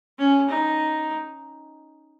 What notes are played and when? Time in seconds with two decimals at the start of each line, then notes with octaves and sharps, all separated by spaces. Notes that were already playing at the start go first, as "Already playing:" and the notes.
0.19 C#4
0.49 D#4